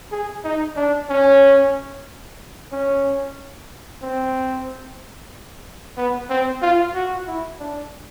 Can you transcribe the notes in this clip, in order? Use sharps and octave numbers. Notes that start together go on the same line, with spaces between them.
G#4
D#4
D4
C#4
C#4
C4
B3
C4
F4
F#4
E4
D4